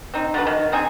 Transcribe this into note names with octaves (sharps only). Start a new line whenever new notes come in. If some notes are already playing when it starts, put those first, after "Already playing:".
C4 D#4
D3 F#4 B4
D#3
C4 D#4 G#4